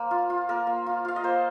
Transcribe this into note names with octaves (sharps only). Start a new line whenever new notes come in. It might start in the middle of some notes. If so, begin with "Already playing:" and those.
Already playing: A#3 C5
F4
F4
A#3 A#4
A#3
F4
F4 F5
D#5
A#3 C5